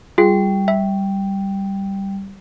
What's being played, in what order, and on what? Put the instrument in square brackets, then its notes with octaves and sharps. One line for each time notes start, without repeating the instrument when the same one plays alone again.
[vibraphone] G3 [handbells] F4 G#4
[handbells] E5